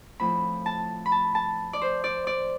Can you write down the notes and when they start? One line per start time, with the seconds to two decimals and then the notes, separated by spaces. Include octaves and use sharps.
0.19 A2 F3 C4 B5
0.66 A5
1.06 B5
1.12 A5
1.35 A5
1.73 D5
1.82 C5
2.04 D5
2.27 D5